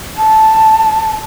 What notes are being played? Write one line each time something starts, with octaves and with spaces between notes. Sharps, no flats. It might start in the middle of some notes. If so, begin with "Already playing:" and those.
A5